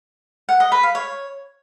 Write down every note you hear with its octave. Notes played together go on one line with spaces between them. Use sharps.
F#5
D#5
B4
F5
C#5